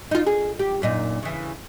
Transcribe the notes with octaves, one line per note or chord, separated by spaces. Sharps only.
D#4 F4
G#4
G4
F#2 A#2 D#4
C#3 E3